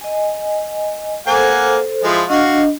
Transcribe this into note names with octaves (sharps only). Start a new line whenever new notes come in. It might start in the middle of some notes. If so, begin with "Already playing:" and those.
D#5 G#5
A#3 A4 C5 F#5 G#5
F3 G#3 E4
D4 F#4 D#5 F5